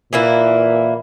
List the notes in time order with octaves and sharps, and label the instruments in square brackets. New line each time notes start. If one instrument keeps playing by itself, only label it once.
[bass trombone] A#2 [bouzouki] E3 A#3 E4